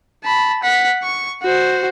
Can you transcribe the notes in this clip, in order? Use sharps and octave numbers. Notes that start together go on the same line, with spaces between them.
A5 B5
F#5 B6
C#6
F#4 C5